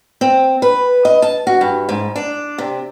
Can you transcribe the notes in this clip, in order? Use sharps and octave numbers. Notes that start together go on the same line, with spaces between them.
C4
B4
D#5
A5
F#4
G2
G#2
D4
C3